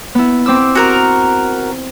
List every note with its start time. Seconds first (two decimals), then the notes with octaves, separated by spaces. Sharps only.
0.15 B3 E4
0.46 C4 D6 E6
0.75 F#4 A#4